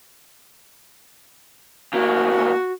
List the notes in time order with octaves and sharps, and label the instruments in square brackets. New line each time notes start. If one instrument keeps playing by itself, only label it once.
[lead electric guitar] D2 A#3 [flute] F#4